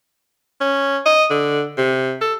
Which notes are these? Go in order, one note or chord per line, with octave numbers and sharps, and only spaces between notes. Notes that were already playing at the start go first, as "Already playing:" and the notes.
C#4
D#5
D3
C3
A4